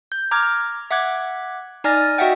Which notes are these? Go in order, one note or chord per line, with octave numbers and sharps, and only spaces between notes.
G6
A#5 D6 F6 G#6
E5 F#5 D6 F#6 G#6
D#4 D5 G#5 F6 A6 A#6
F#4 D#5 E5 F#5 G5